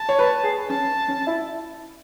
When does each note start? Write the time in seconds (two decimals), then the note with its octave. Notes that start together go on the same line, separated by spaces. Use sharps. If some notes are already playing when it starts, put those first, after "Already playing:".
Already playing: A5
0.09 C#5
0.19 B4
0.44 G#4
0.70 C#4 A5
1.08 C#4
1.27 E4